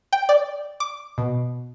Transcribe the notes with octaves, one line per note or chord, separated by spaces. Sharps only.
G5
D5
D6
B2